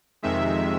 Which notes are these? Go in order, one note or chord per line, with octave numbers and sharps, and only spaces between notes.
F2 C3 D#3 G#3 E5